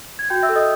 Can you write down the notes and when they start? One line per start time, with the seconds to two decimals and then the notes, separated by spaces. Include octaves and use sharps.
0.19 G#6
0.30 F#4 G5 G6
0.43 E5 E6
0.49 A4
0.55 D#5 D#6